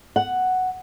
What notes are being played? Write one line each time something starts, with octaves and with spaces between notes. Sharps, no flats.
F#5